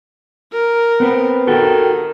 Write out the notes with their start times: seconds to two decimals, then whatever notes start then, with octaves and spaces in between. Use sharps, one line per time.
0.52 A#4
1.00 B3 C4 B4
1.47 D#3 F#4 G4 A4